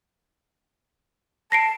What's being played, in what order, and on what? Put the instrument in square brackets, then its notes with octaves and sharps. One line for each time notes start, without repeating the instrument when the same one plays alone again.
[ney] A5 [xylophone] A#6 C7 D7